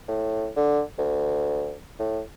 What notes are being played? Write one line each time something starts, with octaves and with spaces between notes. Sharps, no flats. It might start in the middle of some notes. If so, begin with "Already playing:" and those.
A2
D3
D2
A2